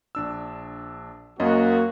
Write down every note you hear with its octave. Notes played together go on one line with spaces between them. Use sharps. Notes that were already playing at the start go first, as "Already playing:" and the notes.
A#1 D4 E6
F#2 A#3 C#4 F#4 D#5